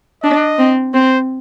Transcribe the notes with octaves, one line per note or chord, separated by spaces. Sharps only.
D4 D#5
C4
C4 C5